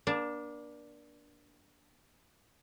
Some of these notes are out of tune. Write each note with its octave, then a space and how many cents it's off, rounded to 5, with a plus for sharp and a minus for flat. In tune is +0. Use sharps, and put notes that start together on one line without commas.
A#3 +40 D4 +0